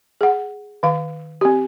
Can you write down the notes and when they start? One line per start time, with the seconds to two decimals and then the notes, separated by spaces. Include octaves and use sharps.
0.21 G#4 F#5
0.83 D#3 F5
1.41 C4 G4